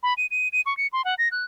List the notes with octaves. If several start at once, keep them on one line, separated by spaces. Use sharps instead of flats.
B5
D#7
D#7
D#7
C#6
C#7
C6
F#5
A#6
F#6